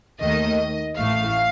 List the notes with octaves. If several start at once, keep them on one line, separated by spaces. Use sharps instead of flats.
D#2 D#3 A3 D#5
A1 A2 A3 F5